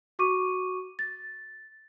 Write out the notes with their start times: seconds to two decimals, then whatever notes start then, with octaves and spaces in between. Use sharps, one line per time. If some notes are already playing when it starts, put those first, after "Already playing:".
0.19 F#4 C#6 D6 D#7
0.99 A6